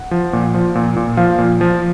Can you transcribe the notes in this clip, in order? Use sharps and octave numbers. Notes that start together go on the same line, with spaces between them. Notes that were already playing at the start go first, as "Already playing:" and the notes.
Already playing: F#5
F3
A#2
F3
A#2
A#2
F3 F5
A#2
F3